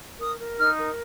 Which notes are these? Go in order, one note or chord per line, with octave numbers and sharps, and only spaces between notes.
A#4 D#6
A#4
D#4 F6
A#4